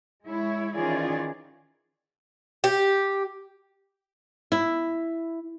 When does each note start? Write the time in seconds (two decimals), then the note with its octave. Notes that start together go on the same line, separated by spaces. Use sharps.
0.25 G#3 E4 C#5
0.73 D#3 E3 C#4 F4 G#4 D5
2.64 G4
4.52 E4